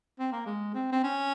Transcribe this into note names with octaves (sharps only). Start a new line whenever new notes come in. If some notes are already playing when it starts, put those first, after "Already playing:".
C4
A#3
G#3
C4
C4
C#4